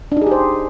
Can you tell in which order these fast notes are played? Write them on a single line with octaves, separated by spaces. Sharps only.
D4 D#4 G#4 G4 C5